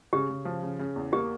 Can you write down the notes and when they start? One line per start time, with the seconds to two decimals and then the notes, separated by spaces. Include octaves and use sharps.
0.13 C#3 G4
0.30 C#3
0.45 F3
0.63 C#3
0.79 C#3
0.96 E2
1.12 A#3 G4